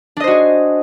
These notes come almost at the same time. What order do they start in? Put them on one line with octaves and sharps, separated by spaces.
D4 D#5 C5 F#4 G#4